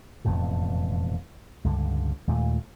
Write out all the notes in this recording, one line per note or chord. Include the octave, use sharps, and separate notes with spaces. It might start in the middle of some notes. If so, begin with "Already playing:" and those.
E1 F2 A2 C#3
C#2 G2 D3
D#2 A#2 G#3 A3